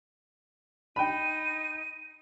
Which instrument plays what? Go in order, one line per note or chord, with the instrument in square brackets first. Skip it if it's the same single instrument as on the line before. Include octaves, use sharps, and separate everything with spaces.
[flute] D#4 [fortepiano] G5 B5 [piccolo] D#7